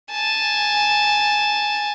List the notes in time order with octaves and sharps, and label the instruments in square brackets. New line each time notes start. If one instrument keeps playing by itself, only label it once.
[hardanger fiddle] G#5 A5